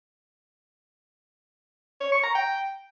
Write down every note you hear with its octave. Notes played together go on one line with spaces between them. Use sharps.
C#5
C#6
A#5
G5